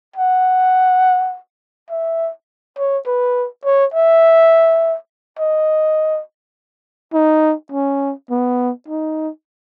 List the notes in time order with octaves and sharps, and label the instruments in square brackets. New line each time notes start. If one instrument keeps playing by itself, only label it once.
[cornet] F#5
E5
C#5
B4
C#5
E5
D#5
D#4
C#4
B3
D#4